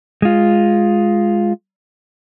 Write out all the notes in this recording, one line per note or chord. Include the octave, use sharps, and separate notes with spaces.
G#3 F4